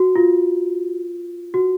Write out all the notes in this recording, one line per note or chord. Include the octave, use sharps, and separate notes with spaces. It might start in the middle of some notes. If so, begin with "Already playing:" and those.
Already playing: F#4
F4
F#4